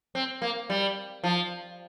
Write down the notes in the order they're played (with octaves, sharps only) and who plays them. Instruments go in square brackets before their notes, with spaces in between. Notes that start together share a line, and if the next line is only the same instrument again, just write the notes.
[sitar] C4
A#3
G3
F3